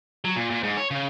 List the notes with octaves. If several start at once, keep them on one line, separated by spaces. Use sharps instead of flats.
F#3
A#2
A#2
G#2
C#5
C#3